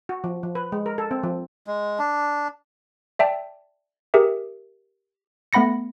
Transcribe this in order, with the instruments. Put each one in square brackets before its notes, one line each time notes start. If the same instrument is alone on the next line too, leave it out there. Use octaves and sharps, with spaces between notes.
[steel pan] F#4
F3
F3
B4
G#3
A#4
A4
C4
F3
[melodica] G#3
D4
[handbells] D5 E5 G5 A5
G4 G#4 A#4 E5
A3 B3 F#5 B5 A#6 C#7